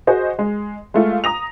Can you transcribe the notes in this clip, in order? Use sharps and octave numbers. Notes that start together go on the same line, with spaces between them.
F#4 G#4 C5 D#5
G#3
G#3 A3 F4
A#5 D#6 A#6 F7